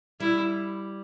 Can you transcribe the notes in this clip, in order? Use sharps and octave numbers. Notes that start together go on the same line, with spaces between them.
G3 E4